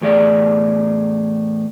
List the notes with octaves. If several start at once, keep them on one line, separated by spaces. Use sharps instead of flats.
E2 A2 G#4 D5